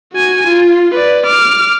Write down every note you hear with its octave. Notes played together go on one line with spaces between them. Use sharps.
F#4 G#5
F4
B4 D5
D6 F6